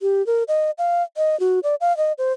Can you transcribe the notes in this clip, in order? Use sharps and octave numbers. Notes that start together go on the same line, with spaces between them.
G4
A#4
D#5
F5
D#5
F#4
D5
F5
D#5
C5